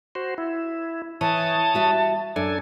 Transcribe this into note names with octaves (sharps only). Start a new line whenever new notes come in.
F#4 C5
E4
E3 C#5 A5 D#6
G3 F#4 E5
F#2 D4 A4 G#5